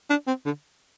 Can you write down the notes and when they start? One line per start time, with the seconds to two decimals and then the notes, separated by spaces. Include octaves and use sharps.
0.10 D4
0.28 C4
0.46 D3